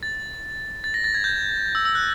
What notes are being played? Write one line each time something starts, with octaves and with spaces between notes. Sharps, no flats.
A6
A6
A#6
A6
G#6
G6
E6
E6
F#6